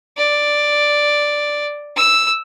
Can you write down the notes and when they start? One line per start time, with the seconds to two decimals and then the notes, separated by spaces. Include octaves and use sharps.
0.18 D5
1.97 E6